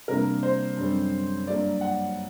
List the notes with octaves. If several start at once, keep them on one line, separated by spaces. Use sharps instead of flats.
C3 G3 A#3 D4 A#4
C5
F#2 D3 G3 C4
G2 F#3 A#3 D5
F#5